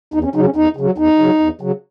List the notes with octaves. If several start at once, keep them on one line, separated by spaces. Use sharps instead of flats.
E2 D#4
C#4
C#3 F#3 D#4
C#4
E2 D#4
C#3 F#3
E2 D#4
C#3 F#3
E2
C#3 F#3